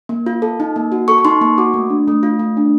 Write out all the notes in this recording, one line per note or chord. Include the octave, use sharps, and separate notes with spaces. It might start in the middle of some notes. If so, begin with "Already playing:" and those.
A#3
F4
A4
D#4
A#3
F#4
A4 C#6
C#6
D#4 C6
A#3 C#6
F#4 D6
A3
D4
A3
F4
A3
D4